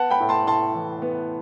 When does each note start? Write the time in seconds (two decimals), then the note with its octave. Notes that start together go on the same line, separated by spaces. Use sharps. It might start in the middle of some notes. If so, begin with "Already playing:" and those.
Already playing: B3 F#5 A5
0.11 G5 B5
0.20 A2
0.29 A5 C6
0.47 A2 A5 C6
0.75 E3
1.02 B3